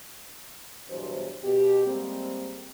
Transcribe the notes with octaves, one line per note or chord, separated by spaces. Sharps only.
E2 G2 B2 F#3 C5
B2 G4
G3 G#3 A#3 C4